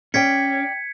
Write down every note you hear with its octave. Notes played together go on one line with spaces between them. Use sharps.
C#4 D5 G5 G#6 B6 C#7